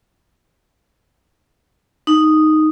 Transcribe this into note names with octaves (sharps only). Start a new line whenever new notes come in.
D#4